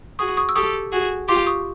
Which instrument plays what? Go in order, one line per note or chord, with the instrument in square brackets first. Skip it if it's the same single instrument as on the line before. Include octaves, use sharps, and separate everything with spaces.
[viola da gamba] F#4 G#4 [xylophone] C#6 D#6
[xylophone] C#6 D#6
E6
[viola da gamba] G4 A4 [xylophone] C#6 D#6
[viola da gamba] F#4 G#4
[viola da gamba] F4 G4 [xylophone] C6 D6
[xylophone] C#6 D#6